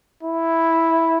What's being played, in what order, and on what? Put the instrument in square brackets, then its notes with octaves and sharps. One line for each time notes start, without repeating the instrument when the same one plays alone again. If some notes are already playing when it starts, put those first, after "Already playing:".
[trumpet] E4